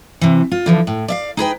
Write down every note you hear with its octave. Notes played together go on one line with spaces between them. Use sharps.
C3 E3
F4
D3 E3 F3
A2
D5 E5 F5
D#4 G#4 B4 G5